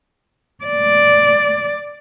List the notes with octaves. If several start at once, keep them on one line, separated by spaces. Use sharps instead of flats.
D5